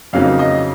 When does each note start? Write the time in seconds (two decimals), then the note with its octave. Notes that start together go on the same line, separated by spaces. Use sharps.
0.13 F2 C#3 F#3 A#3 D#4 F5
0.39 D#5